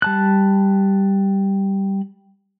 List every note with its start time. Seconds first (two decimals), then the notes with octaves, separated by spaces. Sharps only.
0.02 G3 A5 F#6